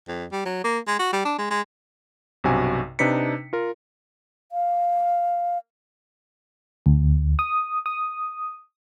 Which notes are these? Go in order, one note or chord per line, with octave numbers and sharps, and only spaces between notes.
F2
G3
F#3
A#3
G#3
F#4
G3
D4
G#3
G#3
B1 G2 C3 F#4 G#5
C3 D4 D#4 B4 B6 C#7
F4 A#4
F5
D2
D#6
D#6